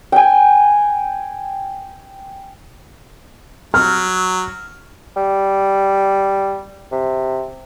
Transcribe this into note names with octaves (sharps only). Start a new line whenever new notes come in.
G5 G#5
F#3 F6
G3
C3